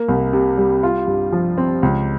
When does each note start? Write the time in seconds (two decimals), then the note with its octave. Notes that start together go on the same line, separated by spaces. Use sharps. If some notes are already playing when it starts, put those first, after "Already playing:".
Already playing: A#3
0.09 C2
0.33 C3
0.58 G3
0.83 F4
1.07 G2
1.32 F3
1.58 C4
1.83 C#2